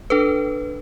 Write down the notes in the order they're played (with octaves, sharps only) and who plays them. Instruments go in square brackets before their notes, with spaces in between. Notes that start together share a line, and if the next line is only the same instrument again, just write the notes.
[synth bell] D4 A4 B4